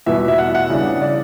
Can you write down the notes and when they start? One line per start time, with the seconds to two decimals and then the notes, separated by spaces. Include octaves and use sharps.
0.06 E2 B2 G3 B3 E5
0.28 E5
0.38 F#5
0.55 F#5
0.70 C#3 E3 G3 D4
1.01 D5